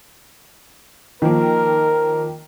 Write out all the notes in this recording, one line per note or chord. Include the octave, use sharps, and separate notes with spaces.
D#3 F3 A#3 A#4